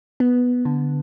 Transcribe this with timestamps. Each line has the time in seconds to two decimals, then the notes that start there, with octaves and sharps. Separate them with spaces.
0.20 B3
0.65 D3